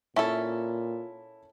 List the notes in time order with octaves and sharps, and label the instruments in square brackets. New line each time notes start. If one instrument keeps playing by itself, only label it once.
[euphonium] A#2 [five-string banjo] C#4 A4 [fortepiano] E4 E5 A5